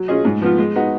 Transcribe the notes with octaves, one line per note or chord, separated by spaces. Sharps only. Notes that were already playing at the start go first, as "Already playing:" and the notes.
Already playing: F#3
C#4 F4 G#4 D#5
G#2
F3 B3 F4
G#3
B3 D#4 F#4